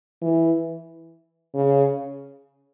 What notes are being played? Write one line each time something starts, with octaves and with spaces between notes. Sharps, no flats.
E3
C#3